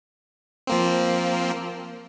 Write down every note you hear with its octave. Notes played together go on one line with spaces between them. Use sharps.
F3 A#3 C4